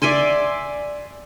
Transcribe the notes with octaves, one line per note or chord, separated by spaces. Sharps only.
D5 E5 G#5 C6